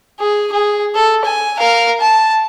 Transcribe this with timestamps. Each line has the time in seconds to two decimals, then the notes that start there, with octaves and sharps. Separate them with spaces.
0.20 G#4
0.52 G#4
0.95 A4
1.24 G#5
1.58 A#4 F5
2.00 A5